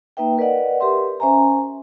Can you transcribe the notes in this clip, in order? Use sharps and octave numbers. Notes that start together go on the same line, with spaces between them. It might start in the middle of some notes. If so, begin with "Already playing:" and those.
A#3 D#4 B4 E5 G5
A#4 B4 D5 D#5 F#5
G4 A#4 B4 E5 C6
C#4 C5 E5 G#5 A#5